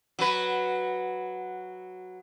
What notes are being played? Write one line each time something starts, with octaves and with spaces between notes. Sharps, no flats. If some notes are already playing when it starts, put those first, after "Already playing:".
F#3 B4